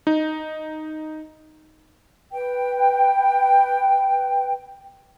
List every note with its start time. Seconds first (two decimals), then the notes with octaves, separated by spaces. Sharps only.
0.07 D#4
2.31 B4 G5